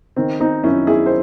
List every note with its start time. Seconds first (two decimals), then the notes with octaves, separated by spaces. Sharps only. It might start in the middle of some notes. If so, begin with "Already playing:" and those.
0.16 D#3 C4
0.40 C4 D#4
0.64 F#2 C#4 E4
0.87 E4 G#4
1.06 C5